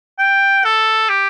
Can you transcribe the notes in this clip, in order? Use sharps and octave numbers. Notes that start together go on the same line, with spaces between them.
G5
A4
G4